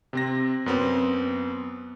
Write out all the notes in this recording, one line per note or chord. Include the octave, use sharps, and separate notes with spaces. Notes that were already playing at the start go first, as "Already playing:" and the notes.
C3 C4 A#6
F#2 B3 C4